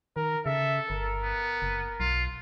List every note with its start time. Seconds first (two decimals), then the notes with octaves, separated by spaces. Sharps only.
0.16 D#3 A#4
0.46 C#3 A4 E5
0.90 G1 A#4
1.23 B3
1.62 F#1
2.00 B1 F4